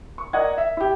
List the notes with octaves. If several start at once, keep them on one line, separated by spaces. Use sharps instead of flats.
C#6
A#4 D5 D#5 F#5 G#6
E5
E4 G4